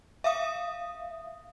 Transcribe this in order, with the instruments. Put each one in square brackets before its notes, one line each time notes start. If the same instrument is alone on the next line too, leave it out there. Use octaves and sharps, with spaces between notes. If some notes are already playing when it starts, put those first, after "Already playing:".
[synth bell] E5 F5 D#6